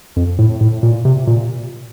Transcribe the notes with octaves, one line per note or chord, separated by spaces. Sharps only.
F2
A2
A2
A#2
C3
A#2